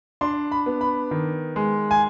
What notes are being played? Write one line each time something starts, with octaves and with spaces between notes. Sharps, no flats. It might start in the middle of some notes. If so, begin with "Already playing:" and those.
D4 C6
B5
B3
B5
D#3
G#3
G#5